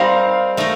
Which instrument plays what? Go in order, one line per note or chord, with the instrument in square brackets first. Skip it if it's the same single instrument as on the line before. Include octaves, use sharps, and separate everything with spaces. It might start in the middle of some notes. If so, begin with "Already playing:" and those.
Already playing: [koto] G3 C4 D#4 G4 A#4 [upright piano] F5
[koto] A3 D#4 A#4